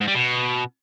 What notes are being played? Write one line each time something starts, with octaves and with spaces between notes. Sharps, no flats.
G#2
G3
B2